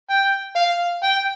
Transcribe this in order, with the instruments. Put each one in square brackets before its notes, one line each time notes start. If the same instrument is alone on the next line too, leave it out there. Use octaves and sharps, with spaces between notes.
[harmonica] G5
F5
G5